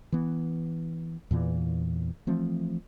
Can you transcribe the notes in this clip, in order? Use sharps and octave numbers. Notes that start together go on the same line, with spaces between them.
E3 B3
E2 A#2 E3
E3 F3 A3 C4